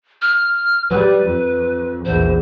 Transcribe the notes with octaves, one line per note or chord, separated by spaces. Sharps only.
F6
G3 B4
F2
A#1 E2 C5